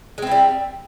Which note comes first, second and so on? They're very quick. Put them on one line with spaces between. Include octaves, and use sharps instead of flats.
G#3 C4 E4 G3